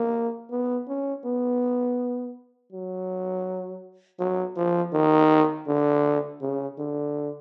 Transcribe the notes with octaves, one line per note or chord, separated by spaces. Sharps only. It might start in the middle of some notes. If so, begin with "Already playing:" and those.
Already playing: A#3
B3
C#4
B3
F#3
F#3
F3
D#3
D3
C#3
D3